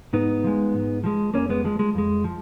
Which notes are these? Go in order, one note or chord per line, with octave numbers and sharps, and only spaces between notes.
G#2 B3 D#4
F3 G#3
G#2
F3 G#3
F2 A#3 C#4
G#3 B3
F3 G#3
G#3
F2 G#3
F3